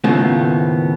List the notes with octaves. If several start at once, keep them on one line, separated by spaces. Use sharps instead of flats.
D#2 A2 C#3 F3 A3 B3